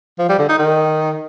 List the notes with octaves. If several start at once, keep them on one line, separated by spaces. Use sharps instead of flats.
F3
G3
D3
D#4
D#3